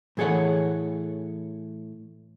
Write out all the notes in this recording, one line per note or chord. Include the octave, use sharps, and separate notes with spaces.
A2 E3 G#4 A4 C#5 F#5